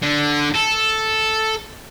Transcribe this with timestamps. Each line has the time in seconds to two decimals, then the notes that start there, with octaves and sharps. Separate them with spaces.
0.02 D3
0.55 A4